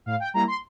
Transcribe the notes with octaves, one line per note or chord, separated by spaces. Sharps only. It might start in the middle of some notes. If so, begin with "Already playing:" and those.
A2 F5
G5
G3 A#3 E4 A#5
C6